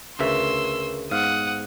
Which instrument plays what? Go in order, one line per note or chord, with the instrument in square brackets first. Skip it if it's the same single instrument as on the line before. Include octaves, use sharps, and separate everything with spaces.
[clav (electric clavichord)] D2 C#3 E5 [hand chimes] A#4 B4 C#6 [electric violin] C6 E6
[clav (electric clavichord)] G#2 F5 [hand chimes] B3 [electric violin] F#5 D#6